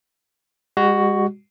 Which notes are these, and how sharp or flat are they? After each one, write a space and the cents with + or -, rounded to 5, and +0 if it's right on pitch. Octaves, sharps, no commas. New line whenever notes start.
G#3 -45 F#4 +10